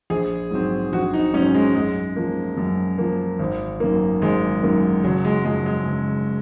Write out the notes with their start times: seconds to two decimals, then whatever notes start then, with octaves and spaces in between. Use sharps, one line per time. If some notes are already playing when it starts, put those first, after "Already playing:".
0.10 A#1 G#4
0.51 G#2 F#3 C4
0.93 A#1 F#4
1.13 D#4
1.34 G#2 F#3 C4 C#4
1.55 G#3
1.75 F#2 G#3
2.16 F3 A#3
2.57 F#2
2.98 F3 A#3
3.39 G#1
3.80 F#2 D#3 A#3
4.22 G#1 G#3
4.63 F#2 D#3 A#3
5.04 F#1 F#3
5.25 G#3
5.45 F#2 F3 G#3
5.66 G#3
5.87 F#1